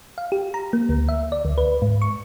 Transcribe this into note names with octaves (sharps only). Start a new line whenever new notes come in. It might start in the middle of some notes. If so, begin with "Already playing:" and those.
F5
G4
A#5
A#3
D2
E5
D5
D2
B4
G#2
C#6